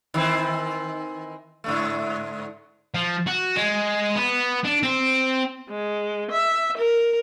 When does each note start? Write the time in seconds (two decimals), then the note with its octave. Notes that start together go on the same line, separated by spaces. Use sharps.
0.14 D#3 E3 C4
1.64 G#2 D3 A3
2.95 F3
3.27 F#4
3.57 G#3
4.16 B3
4.65 D4
4.83 C4
5.69 G#3
6.31 E5
6.78 A#4